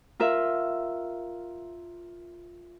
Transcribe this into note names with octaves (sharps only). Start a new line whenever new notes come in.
F4 A#4 E5